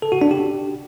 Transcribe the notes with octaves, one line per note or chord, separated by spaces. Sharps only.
A4
F#4
D4
G4